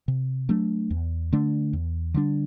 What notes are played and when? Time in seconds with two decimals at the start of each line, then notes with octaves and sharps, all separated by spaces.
0.08 C3
0.49 F#3 A3 D4
0.90 E2
1.32 D3 A3 D4
1.73 E2
2.14 D3 G3 D4